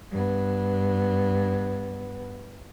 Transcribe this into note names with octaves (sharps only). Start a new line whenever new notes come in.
G2 B3